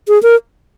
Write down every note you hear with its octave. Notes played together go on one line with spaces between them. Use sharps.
G#4
A#4